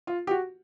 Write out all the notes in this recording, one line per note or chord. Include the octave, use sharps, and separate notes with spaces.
F4
G4
F#4